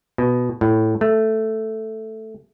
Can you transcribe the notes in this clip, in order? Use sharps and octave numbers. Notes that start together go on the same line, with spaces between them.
B2
A2
A3